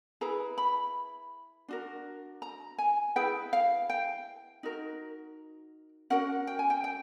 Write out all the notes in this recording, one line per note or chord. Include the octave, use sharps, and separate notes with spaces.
E4 G#4 B4 A#5
B5
D4 F#4 A#4
A#5
G#5
E4 G#4 B4 G5
F5
G5
D#4 F#4 A#4
C#4 F#4 A#4 F#5
G5
G#5
G5
G5